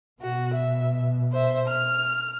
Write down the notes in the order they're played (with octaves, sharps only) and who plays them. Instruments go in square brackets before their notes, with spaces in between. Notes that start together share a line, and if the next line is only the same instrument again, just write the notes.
[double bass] B2 [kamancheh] F#4
[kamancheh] E5
C5 E5
F6